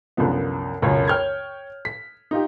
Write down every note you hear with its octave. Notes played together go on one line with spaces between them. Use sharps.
C2 F#2 D3 F3 B3
E1 C#2 F#2 C#5
C#5 G5 F6 G6 G#6
B6
D#4 F4 G4